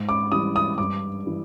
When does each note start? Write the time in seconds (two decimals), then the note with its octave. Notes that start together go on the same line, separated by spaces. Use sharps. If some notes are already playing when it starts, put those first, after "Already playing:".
Already playing: G#2
0.09 D6
0.32 E3 G3 D#6
0.56 D#6
0.78 G2 D6
1.25 E3 G3